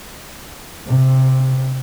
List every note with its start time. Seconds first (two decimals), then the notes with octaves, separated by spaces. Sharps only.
0.86 C3